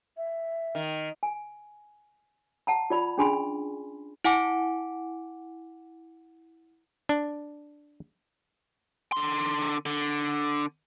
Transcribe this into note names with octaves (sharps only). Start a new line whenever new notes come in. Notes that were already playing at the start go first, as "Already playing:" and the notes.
E5
D#3
G#5
F#5 A5 A#5
F4 D5 B5
C#4 D4 G#4 G#5 B5 C6
E4 F#5 G#5 D6 D7
D4
D3 C6
D3